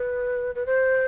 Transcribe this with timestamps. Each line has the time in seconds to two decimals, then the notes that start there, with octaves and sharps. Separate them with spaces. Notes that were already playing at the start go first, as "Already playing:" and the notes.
Already playing: B4
0.55 B4
0.66 C5